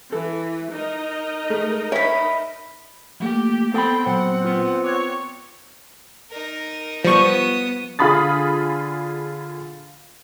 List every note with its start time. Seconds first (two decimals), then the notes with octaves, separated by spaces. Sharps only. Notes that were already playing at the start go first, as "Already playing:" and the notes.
0.12 E3 A4
0.72 D#4 A#4 D#5
1.50 G#3 A3
1.92 E4 C#5 B5
3.20 F3 A3 A#3 G4
3.74 B3 C4 A4 G5 A5 B5
4.06 A#2 F#3 C4 F#5
4.45 B3 F4
4.84 C#5 D6 F#6 G#6
6.31 D#4 A#4
7.05 F3 G3 B3 C#6 D#6
7.99 D3 F4 G#4 B5 D#6 A6